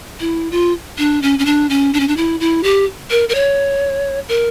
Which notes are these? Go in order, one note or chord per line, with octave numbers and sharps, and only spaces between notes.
E4
F4
D4
C#4
C#4
D4
C#4
D4
C#4
D4
E4
E4
G4
A#4
A#4
C#5
A#4